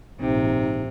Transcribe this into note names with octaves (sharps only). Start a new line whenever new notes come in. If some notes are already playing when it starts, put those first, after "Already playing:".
A#1 G#2 C3 D#4